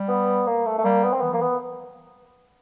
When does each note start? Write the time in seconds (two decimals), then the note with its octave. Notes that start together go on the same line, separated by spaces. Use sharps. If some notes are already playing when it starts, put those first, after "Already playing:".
Already playing: G3
0.08 B3
0.46 A#3
0.66 A3
0.78 A3
0.84 G3 A#3
1.03 B3
1.13 C4
1.21 E3 B3
1.31 F3
1.34 A#3
1.41 E3 B3